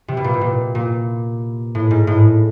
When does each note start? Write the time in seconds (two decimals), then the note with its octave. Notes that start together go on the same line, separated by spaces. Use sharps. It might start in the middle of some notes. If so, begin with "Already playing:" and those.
0.08 C3
0.17 B2
0.24 A#2
0.34 B2
0.41 A#2
0.75 A#2
1.75 A2
1.91 G#2
2.07 A2